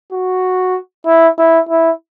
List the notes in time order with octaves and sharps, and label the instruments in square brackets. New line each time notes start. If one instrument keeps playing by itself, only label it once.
[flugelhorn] F#4
E4
E4
E4